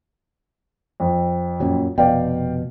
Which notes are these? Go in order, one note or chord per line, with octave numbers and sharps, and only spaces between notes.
F2
F#2 A#2 F#3
F1 B2 D5 F5 G5